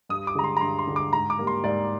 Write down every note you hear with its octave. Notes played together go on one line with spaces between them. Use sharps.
G2 D#6
D6
D3 G#3 A#5
C6
A#5
G2 C6
C6
D3 G#3
D6
G#2 A#5
D6
G3 A#3
C6
G#2 D5